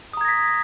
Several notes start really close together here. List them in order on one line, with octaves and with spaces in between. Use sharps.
D#6 A#5 G#6 A#6 B6